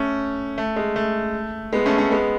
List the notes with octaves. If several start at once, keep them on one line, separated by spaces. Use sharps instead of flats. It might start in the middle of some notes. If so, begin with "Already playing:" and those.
Already playing: A3 C#4
A3
G#3
A3
G#3 B3
A3 C#4
A3 C#4
G#3 B3